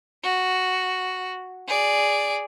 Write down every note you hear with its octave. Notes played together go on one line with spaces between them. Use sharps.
F#4
G#4 D5